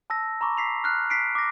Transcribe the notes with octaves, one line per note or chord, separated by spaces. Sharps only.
A5 E6 A#6
A#5 B5 C#6 D6
B6 C7 F7
F6 F#6 C7
B6 C7 D7
D6 A#6